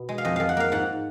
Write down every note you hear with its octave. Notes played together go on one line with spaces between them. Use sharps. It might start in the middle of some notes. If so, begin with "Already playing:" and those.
Already playing: B2
G#3
F5
F2 D#5
F2 F5
F#5
A#3 F5
G#2 F#5